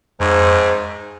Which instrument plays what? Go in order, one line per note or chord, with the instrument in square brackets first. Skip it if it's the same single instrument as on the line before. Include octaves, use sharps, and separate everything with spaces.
[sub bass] F2 [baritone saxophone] G#2